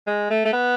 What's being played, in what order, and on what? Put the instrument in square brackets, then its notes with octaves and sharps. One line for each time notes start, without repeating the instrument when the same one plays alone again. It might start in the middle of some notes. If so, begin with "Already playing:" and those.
[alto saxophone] G#3
A3
A3
B3